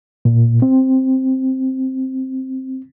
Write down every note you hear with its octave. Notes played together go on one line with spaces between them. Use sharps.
A#2
C4